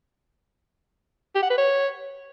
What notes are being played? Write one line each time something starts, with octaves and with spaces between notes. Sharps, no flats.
G4
F#5
B4
C#5